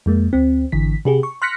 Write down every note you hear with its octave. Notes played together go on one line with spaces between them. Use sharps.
F2 G#3 A#3
D2 C4
G#1 D3 E3 B6
C3 G4 G#4
C#6
C6 F6 F#6 A#6 B6 C#7